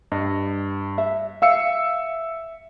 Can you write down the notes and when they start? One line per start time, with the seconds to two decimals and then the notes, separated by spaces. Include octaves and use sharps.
0.12 G2 D#5
0.98 E5
1.42 E5 F5 E6 C#7